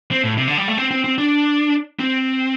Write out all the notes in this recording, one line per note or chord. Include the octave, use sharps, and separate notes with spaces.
C4
A2
C3
D3
G3
A3
C4
C4
C4
D4
C4